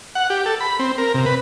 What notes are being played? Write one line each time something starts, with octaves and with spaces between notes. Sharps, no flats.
F#5
G4
A4
B5
C4
A#4
C3
B4